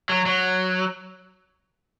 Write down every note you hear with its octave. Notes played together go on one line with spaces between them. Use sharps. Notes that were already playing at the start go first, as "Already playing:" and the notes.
F#3
F#3